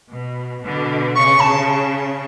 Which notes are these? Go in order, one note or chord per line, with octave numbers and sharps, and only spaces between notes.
B2
B2 D3
C#3 C#6
A5